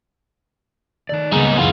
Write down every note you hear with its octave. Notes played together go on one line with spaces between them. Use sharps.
D#3 A3 D#4 D5
C#2 C#3 G3 G#3 A#3 B3 D#4 C#7
F#2 E3 B3 F4